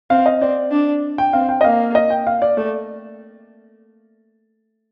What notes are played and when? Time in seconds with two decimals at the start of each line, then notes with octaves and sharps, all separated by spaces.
0.10 C4 F5
0.26 D#5
0.41 C4 D5
0.71 D4
1.18 G5
1.33 C4 F5
1.49 G5
1.61 D#5
1.64 A#3 F5
1.95 D#5
2.10 G5
2.27 F5
2.42 D5
2.57 A3 D5